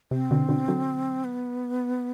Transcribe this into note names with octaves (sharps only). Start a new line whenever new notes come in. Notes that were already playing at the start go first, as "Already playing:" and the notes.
C3 C4
B2 D3
B2 D3
D3 F#3
B3